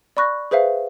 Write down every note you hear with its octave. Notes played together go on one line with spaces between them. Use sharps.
D5 B5 C#6 F#6 A#6
G#4 B4 C5 E5 F5